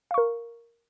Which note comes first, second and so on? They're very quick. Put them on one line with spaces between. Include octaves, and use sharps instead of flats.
F5 C#6 A#4